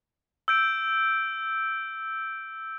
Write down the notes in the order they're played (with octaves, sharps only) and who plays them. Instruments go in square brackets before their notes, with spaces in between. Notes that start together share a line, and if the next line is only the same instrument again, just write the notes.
[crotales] E6 G6 D7